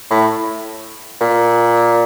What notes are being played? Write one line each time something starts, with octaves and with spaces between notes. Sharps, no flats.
A2
A#2